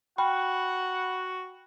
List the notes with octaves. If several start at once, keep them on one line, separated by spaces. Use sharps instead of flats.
F#4 F#5 G5 B5